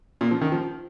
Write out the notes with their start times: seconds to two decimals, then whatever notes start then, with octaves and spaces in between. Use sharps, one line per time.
0.21 A#2
0.31 F3
0.41 D#3
0.52 F3